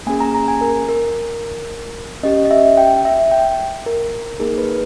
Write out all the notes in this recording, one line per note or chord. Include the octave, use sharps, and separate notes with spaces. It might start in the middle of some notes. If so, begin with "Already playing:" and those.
A#3 C#4 G#4 G#5
A#5
A#5
G#5
A#4
A#4
C#4 G4 D#5
D#5
E5
G5
E5
G5
A#4
A#3 D#4 G#4 A#4
B4